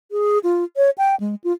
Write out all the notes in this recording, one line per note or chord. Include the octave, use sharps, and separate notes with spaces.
G#4
F4
C#5
G5
G#3
F4